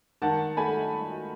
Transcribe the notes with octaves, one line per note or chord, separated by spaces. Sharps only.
D#3 F#5 A5
A3 G#5 B5